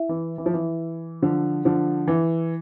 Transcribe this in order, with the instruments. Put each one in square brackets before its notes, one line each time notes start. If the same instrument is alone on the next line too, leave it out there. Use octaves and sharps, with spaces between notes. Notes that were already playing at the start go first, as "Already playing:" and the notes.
Already playing: [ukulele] E4 E5
[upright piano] E3
E3
F3
E3
D3 F3
D3 F3
E3